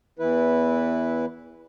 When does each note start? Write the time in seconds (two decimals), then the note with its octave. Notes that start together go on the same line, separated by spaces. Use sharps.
0.19 E2 E3 E4 B4